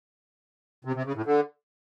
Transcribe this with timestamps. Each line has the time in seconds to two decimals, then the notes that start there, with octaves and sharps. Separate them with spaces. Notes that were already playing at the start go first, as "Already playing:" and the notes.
0.85 C3
0.95 C3
1.05 C#3
1.15 A2
1.26 D3